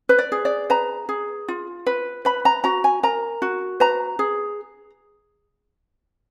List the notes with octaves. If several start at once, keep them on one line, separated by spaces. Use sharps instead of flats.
B4
D5
G#4
D5
B4 A#5
G#4
F4
B4
B4 B5
A#5
F#4 A#5
G#5
A#4 A#5
F#4
B4 A#5
G#4